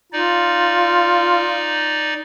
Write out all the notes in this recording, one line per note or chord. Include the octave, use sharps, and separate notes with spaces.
D#4 F4 D5